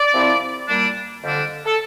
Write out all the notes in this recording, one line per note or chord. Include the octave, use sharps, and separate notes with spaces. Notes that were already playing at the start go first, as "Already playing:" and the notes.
Already playing: D5
C2 C3 F3 C4 E4
A#2 G3 A#3 D4
F2 D3 G3 D4
A4